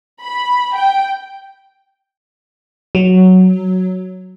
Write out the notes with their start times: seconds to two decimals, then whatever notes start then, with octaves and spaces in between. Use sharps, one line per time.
0.22 B5
0.75 G5
2.95 F#3